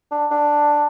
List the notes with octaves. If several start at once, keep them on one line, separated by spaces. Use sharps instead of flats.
D4
D4